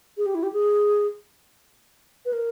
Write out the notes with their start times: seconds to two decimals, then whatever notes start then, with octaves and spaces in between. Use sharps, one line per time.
0.17 G#4
0.26 G4
0.35 E4
0.43 G4
0.53 G#4
2.25 B4
2.33 A#4